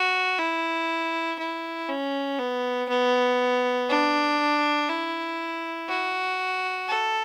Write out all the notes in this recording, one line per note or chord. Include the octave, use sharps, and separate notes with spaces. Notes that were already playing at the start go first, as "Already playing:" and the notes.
Already playing: F#4
E4
E4
C#4
B3
B3
D4
E4
F#4
A4